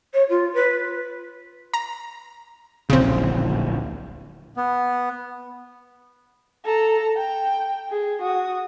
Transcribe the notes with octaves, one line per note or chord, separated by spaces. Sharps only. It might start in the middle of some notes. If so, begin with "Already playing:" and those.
C#5
F4
B4
A#5
D1 A#1 C#3 C4
B3
A4 A#5
G5
G#4
F#4 D#6